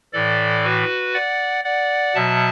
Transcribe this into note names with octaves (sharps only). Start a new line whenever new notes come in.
A2 E3 A4 D5
F#4 B4
D5 F#5
D5 F#5
B2 F#3 E5 A5